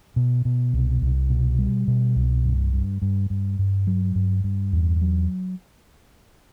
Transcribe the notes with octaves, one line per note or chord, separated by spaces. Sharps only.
B2
B2
C2
C2
B2
G3
B2
C2
G2
G2
G2
G2
G2
F#3
G2
G2
E2
F#3